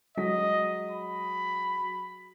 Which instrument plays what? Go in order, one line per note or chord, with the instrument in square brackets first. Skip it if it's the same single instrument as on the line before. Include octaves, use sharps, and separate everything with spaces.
[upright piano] F#3 G#3 B6 [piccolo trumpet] D#5
[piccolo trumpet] B5